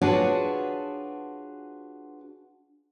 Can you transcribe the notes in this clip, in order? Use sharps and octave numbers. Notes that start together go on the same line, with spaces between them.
D4 F4 F#4 G#4 B4 C#5